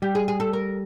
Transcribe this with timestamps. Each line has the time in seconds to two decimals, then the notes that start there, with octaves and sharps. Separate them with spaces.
0.02 G3 G4
0.15 G#4
0.28 G#4
0.40 A4
0.53 A#4